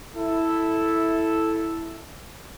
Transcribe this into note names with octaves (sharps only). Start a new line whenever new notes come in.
E4 A4